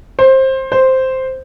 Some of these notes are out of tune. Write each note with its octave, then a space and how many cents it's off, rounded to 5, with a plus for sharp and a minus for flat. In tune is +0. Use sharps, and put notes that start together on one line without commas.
C5 +20
C5 +0